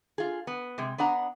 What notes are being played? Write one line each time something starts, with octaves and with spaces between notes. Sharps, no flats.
F4 G#4
B3
C3 G#3
B3 D4 F#5 A#5